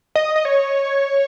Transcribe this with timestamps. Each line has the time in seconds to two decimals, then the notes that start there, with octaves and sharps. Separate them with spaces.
0.15 D#5
0.36 D#5
0.45 C#5